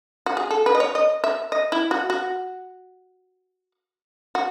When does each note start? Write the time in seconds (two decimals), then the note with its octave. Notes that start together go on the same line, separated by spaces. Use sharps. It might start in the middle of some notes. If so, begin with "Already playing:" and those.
0.26 F#4
0.37 G#4
0.51 A4
0.66 B4
0.75 D#5
0.80 C#5
0.95 D#5
1.24 E5
1.52 D#5
1.72 E4
1.91 F#4
2.10 F#4
4.35 F#4